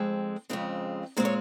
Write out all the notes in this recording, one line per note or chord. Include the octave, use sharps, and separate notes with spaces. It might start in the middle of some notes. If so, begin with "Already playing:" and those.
Already playing: F2 G#3 C4
F2 C#3 G#3 C4
A#2 G#3 C4 C5
C#5